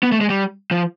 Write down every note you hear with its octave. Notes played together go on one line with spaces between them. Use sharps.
B3
A3
G#3
G3
F3